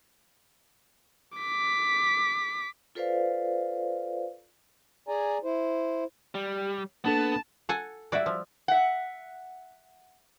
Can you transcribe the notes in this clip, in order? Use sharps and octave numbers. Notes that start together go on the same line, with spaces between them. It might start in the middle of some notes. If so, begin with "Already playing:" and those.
D6 B6
F4 A4 B4 C5 D5 F5
G#4 D5 G#5 A#5
E4 C5
G3 G4
A#3 B3 D4 A4 A5
A4 F#5 G#5
G3 E4 F#4 D5 E5
F3
E5 F#5